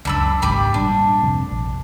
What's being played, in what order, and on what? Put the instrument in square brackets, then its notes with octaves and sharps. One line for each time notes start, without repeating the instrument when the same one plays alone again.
[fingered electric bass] C#2 F#2 [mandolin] D4 B5 E6
[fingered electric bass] G#1 C#2 G#2 [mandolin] G4 B5 D6
[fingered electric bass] A#2 F#3 G3 [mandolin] D4
[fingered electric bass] F2 C3
A#1